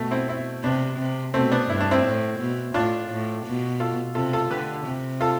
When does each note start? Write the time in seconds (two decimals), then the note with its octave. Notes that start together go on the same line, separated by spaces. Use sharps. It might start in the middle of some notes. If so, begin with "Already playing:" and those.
Already playing: B2 A3
0.11 C4 E4
0.28 C4 E4
0.63 C3 B3 D4
0.99 C3
1.34 B2 A3 C4
1.51 B3 D4
1.69 G2 E4
1.81 D4
1.91 C4 E4
2.04 A2
2.39 B2
2.74 A2 D4 F4
3.10 A2
3.46 B2
3.80 F4 A4
4.15 C3 F4 A4
4.33 F4 A4
4.50 D3 G4 B4
4.86 C3
5.21 F4 A4